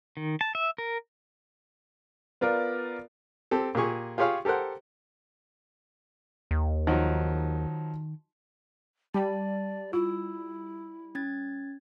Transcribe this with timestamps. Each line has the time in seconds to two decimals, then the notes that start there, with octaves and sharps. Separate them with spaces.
0.17 D#3
0.41 A5
0.55 E5
0.78 A#4
2.41 B3 F4 A#4 D5
3.51 C4 G4 A4
3.75 A#2 G4 G#4 C#6
4.18 F4 G4 G#4 C#5 F5
4.45 G4 A4 A#4 C5 F#5
6.51 D#2
6.87 D#3 F3 F#3 D#4
9.14 G3 D5 A5
9.93 E4 F4 E6
11.15 C#4 G#6 A6